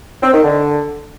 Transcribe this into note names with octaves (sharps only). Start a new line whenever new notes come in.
C4
D#3
D3